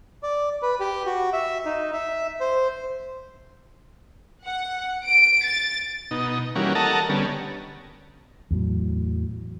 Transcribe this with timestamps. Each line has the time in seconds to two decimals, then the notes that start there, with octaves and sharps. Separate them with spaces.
0.23 D5
0.62 B4
0.80 G4
1.06 F#4
1.33 E5
1.65 D#4
1.93 E5
2.40 C5
4.45 F#5
5.05 D7
5.44 A6
6.11 B2 D#4
6.55 E3 G3 A#3 C#4 F#4
6.75 A4 A#4 D#5 F#5 A5 A#5
7.09 D3 G3 B3 C#4
8.51 E2 A2 F#3